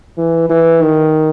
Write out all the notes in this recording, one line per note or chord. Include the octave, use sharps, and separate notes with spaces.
E3
E3
D#3